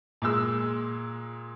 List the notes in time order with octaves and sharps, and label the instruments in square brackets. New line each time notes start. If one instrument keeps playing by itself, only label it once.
[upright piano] A#2 G#3 E6